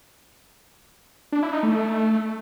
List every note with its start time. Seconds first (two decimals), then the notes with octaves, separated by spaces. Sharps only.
1.32 D4
1.43 E4
1.53 D#4
1.63 A3